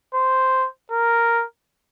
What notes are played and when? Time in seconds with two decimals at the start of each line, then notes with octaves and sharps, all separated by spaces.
0.14 C5
0.91 A#4